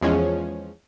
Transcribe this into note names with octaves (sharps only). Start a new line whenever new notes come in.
E2 F3 G#3 C#4